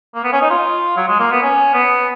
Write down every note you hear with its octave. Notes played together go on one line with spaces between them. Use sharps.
A#3
B3
C#4
D#4
F4
F#3
G#3
A#3
B3
C#4
B3